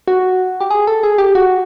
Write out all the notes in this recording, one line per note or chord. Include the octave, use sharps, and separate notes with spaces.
F#4
G4
G#4
A4
G#4
G4
F#4